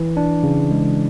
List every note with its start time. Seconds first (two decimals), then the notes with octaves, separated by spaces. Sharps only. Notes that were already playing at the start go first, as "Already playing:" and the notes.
Already playing: E3
0.17 D4
0.43 C#3
0.71 G#3